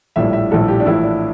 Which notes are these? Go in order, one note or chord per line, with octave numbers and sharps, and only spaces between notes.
A#1 A2 G3 E5
E5
A#1 A2 G3 A4
G4
D4
A#1 A2 E3 E4
D4